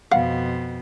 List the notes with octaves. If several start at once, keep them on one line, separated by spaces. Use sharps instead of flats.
F2 B2 F5 F#5